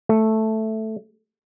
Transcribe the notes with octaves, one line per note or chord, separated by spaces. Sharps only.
A3